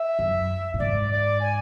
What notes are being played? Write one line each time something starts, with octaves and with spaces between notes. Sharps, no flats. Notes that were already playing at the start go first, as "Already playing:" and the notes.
Already playing: E5
F#2
A2
G#2 D5
D5
G#5